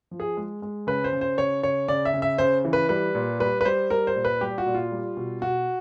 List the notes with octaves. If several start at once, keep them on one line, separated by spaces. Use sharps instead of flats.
F3
G#4
G#3
G#3
C#3 B4
C5
C#3
C5
C#3 C#5
C#3 C#5
C#3 D5
E5
C#3
E5
C#3 C5
E3
B4
G3 B4
A#2
G3 B4
B4
G3 C5
G3 A#4
C5
A#2
B4
G3 G4
F#4
A#2
F4
G3
B2
B2 F#4